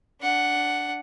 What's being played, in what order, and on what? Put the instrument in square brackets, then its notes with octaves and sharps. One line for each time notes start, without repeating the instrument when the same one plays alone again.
[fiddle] D4 F#5